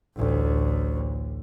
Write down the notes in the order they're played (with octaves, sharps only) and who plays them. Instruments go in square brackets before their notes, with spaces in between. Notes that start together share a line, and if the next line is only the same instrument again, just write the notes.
[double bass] A1 D2